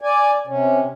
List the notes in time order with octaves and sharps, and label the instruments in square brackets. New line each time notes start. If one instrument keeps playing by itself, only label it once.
[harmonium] D5 G#5
C3 C#4